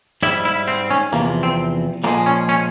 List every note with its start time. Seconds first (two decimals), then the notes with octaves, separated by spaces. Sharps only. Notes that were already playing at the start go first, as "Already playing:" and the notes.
0.23 G#2 G3 E4
0.45 E4
0.68 C4
0.90 C#4
1.13 E2 C3 F3 A#3
1.43 C4
2.04 A#2 F3 G#3 A#3
2.26 C#4
2.49 C#4